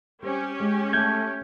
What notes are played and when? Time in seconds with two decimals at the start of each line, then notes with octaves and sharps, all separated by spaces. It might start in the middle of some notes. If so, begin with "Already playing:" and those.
0.23 G3 C4 C#4 G4
0.60 G#3 D#5
0.93 A3 G6 G#6